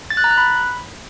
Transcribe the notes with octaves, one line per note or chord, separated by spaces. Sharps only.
A6
F#6
A#5
F#6
B5